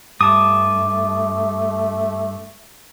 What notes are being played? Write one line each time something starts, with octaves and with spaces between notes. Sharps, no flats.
G2 A3 A5 D6 D#6